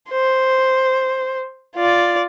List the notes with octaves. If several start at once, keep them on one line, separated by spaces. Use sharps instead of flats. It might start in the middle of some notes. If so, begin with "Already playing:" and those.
C5
F4 D5